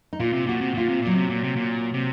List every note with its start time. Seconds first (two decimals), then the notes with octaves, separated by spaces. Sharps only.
0.13 D#4
0.20 A#2 F4
0.33 C3
0.46 A#2 F#4
0.61 C3
0.74 A#2 F4
0.89 C3
1.02 A#2 F#3
1.15 C3
1.30 A#2
1.43 C3
1.56 A#2
1.94 C3